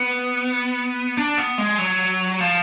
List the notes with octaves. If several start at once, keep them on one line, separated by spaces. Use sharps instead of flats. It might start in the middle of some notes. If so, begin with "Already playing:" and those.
Already playing: B3
D4
B3
G#3
F#3
F3